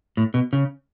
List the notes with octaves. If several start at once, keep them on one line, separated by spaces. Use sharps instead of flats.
A2
B2
C#3